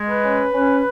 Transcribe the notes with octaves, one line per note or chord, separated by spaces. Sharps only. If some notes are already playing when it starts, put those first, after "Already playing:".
Already playing: G#3
B4
C#4
C#4